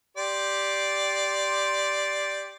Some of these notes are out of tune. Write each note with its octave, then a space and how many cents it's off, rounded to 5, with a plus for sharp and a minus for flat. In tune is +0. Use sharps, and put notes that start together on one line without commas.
G4 +0 D5 +0 C6 +0